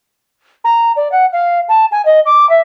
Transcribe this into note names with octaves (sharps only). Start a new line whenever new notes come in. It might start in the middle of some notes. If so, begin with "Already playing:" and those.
A#5
D5
F#5
F5
A5
G#5
D#5
D6
E5